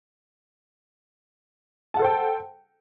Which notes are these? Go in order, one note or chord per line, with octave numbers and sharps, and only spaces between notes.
A4 C5 F#5 G5 A5